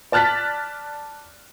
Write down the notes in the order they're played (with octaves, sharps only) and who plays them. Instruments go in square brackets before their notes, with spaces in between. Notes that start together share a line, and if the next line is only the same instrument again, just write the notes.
[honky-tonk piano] D5 A5 F6 F#6 A6 B6